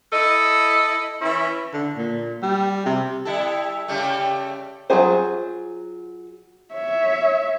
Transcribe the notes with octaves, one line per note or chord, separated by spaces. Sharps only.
E4 A4 D#5
E3 C#4 E4
D3
A#2
G3
C3
G3 E4 A4
C#3 G3 A3
F#3 C4 F4 G#4 C5
C#5 E5